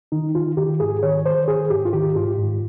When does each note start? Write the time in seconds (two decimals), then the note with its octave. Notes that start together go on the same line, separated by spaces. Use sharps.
0.12 D#3 D#4
0.35 D#3 F4
0.57 D#3 G4
0.80 G#2 G#4
1.03 D#3 C#5
1.26 D#3 C5
1.48 D#3 G#4
1.70 G#2 G4
1.85 F4
1.93 D#3 G4
2.16 G#2 F4
2.38 G#2